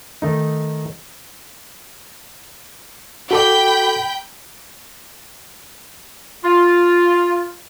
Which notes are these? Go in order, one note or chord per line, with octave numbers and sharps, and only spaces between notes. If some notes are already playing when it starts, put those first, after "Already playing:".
D#3 A3 D#4
F#4 A4 G5 B5 D6 G6
F4